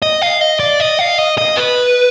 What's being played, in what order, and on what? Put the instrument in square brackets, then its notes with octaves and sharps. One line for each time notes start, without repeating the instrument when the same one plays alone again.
[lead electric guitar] D#5
F5
D#5
D5
D#5
F5
D#5
D#5
B4